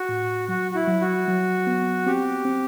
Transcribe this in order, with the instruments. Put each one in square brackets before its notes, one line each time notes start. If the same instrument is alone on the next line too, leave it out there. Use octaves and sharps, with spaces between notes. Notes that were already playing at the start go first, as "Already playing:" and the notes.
Already playing: [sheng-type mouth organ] F#4
[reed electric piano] A2
[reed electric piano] F#3 [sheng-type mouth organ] F#4
[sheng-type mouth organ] F#4
E4
[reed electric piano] F#3
[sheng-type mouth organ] F#4
[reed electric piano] F#3
B3
[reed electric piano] C4 [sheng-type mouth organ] G4
[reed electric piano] C4